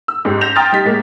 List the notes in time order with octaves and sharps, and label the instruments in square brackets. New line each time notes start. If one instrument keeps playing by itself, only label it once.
[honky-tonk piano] E6
F#1 G#2 G4
G6 A#6 B6 E7 F7
G5 A#5 C6 D#6 F6 A6
G3 D#4 B6
A2 G#3 A#3